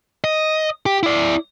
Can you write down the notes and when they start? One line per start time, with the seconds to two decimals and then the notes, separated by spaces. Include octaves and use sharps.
0.24 D#5
0.86 G4
1.03 E4 D5